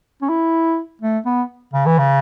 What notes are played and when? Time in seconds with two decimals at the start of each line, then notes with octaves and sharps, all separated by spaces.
0.22 C#4
0.29 E4
1.01 A3
1.26 B3
1.73 C#3
1.86 E3
1.99 C#3